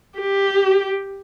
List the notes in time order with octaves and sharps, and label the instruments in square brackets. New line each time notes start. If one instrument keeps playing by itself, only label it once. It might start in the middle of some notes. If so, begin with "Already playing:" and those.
[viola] G4